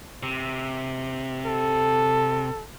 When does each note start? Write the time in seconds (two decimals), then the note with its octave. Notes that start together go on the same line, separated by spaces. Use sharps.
0.23 C3
1.47 A4